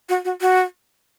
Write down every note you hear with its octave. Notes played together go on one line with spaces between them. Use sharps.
F#4
F#4
F#4